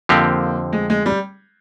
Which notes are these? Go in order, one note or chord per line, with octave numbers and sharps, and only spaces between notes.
F2 D3 F3 A#3 C4 G4
G#3
G#3
G3